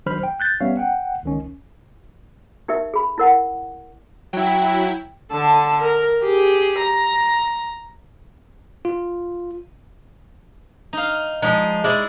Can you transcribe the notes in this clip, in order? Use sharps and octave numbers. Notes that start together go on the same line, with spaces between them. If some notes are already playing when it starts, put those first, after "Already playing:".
D#3 F#3 D4 C5 B5 F6
G5
F#6 G6 A6
G3 B3 C#4 C#5 E5 F5
F#5 G5
C#2 D#3 C#4
D#4 G4 A#4 E5
G#4 B5
E4 A#4 F#5
F#3 E4 G5
D3 A5
A#4
G4 G#4
A#5
F4
D#4 F5
F3 G#3 D#4
G#3 E4 G#4 D5